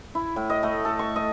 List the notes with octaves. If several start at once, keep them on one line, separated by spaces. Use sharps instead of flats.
E4
A2
D#5
A3
A4
C#6
D#5